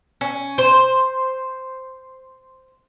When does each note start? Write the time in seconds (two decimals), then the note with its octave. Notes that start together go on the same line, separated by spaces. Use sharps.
0.21 C#4
0.58 C5